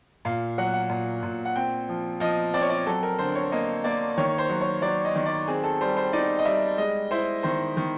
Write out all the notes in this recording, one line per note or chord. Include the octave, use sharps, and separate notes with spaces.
A#2 F5
F#3 F#5
F#5
A#2
A#2
F#5
C4 G5
F3
F3 D#5
C4 D5
C#5
D5
F#3 A4
A#4
D3 C5
C#5
A#3 D#5
A#3 D5
D#3 C#5
C5
F#3
C#5
F#3 D5
D#5
D#3
D5
C4 G#4
A4
G3 C5
C5
D#4 D5
D#5
G3 E5
G#3 D#5
E4 C5
D#3 C5
D#3